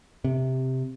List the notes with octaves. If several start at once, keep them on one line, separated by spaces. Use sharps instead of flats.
C3